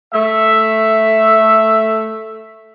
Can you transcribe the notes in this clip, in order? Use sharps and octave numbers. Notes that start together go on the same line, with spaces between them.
A3 E5